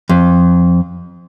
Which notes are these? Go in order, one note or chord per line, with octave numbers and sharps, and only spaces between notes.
F2